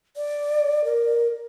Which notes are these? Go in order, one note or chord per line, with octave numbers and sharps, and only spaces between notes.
D5
A#4